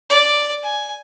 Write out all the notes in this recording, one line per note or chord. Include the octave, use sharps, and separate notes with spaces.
D5
G#5